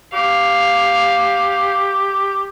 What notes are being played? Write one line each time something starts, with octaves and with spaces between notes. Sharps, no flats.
G4 F5